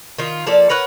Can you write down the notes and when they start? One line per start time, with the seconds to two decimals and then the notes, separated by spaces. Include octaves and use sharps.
0.18 D#3 F4
0.47 F3 A#3 A4 D5
0.69 A#4 B4 C#5 F#5